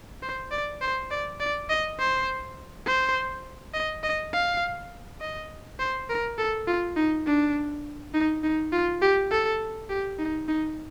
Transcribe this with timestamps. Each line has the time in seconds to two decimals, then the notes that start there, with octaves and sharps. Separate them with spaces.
0.22 C5
0.51 D5
0.81 C5
1.10 D5
1.40 D5
1.69 D#5
1.99 C5
2.86 C5
3.74 D#5
4.03 D#5
4.33 F5
5.20 D#5
5.79 C5
6.09 A#4
6.38 A4
6.67 F4
6.96 D#4
7.26 D4
8.14 D#4
8.43 D#4
8.72 F4
9.02 G4
9.31 A4
9.89 G4
10.19 D#4
10.48 D#4